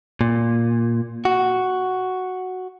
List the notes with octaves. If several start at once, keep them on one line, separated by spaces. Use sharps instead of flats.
A#2
F#4